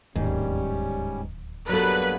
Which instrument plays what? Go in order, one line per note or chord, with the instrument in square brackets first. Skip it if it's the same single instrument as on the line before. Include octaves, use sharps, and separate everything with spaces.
[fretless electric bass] D1 D#2 D#3 [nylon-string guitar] G#2 [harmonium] G3 C#4
[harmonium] G2 A#3 B3 [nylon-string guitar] F#3 A4 [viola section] B4